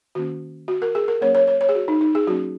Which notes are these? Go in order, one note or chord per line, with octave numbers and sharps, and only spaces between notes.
D#3 A#3 C#4 F#4
F#4
A#4
G#4
A#4
F#3 A#3 C#4 C#5
C#5
C#5
C#5
G#4
F#4
D#4
D#4
G#4
F#3 A#3 C#4 F#4